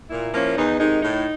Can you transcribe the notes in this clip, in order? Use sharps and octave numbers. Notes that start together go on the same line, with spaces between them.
A#2 E4
F3 A#3 C#4
E2 D#4
C3 D#3 G#3 D#4
A2 D#4